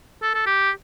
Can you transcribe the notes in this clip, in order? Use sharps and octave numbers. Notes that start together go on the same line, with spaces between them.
A4
A4
G4